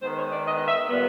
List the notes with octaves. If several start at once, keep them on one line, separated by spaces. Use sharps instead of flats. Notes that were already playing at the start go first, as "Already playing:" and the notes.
D#3 G#3 B3 C5
C#5
D5
D#5
D#5
E5
A#2 G3 B3